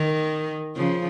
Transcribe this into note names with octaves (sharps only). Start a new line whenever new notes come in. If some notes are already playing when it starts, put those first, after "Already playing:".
Already playing: D#3
C#3 F3